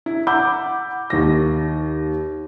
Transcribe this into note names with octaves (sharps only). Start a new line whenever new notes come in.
E4
F#5 B5 D6 E6 G6
D#2 A#6